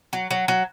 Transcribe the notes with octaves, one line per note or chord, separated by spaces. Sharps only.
F#3
F#3
F#3